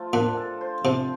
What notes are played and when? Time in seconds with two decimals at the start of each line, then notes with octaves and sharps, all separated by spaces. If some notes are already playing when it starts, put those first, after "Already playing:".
Already playing: F3 A3 F4
0.13 A#2 D4
0.37 A4
0.61 C5
0.85 C3 F3